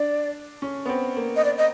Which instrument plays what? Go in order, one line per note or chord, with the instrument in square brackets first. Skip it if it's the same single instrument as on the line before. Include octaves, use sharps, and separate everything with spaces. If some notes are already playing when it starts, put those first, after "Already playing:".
Already playing: [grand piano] D4 [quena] D5
[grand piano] C#4
B3
C4
A#3
[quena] D#5
D5
D#5